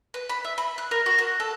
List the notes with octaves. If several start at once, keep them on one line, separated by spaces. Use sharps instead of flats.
B4
B5
E5
B5
F#6
A#4
F#4
F#6
A4